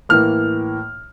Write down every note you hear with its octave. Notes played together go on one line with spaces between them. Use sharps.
A2 E3 A#3 F6